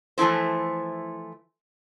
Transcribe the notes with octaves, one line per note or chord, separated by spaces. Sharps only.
E3 F3 A3 E4 C5